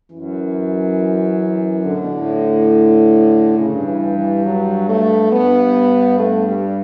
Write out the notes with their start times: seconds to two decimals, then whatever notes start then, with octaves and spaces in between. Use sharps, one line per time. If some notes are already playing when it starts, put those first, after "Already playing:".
0.11 F#2 E3
1.85 A2 D3
1.96 B2
2.07 A2
3.58 G2 C#3
3.88 E3
4.17 E3
4.46 F#3
4.89 A3
5.32 G2 B3
6.19 A3
6.48 G3